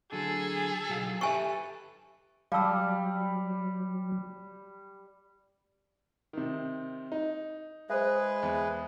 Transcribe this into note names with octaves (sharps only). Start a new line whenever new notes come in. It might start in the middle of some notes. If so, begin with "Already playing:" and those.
D3 F#3 G#4 A4
B1 F#3 F5
G4 A4 B4 E5 G#5 C#6
F#3 G3 D5 F5 A5 E6
C3 D#3
D#4
G#3 G#4 B4 C5 E5
E2